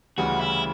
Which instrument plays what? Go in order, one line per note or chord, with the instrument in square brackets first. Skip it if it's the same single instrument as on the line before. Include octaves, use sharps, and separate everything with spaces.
[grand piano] D2 C#3 E3 G3 [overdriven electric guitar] F#4
[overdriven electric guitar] E4